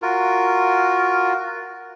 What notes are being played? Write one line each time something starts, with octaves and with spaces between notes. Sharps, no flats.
F4 F#4 A#4